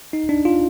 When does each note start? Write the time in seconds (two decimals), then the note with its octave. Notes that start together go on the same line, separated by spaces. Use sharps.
0.13 D#4
0.29 D4
0.45 F4